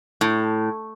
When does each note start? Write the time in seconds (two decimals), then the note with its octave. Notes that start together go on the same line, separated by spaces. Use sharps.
0.21 A2